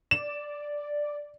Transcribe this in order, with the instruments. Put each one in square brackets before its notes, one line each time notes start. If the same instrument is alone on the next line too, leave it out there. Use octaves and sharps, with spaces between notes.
[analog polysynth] D5 [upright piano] E7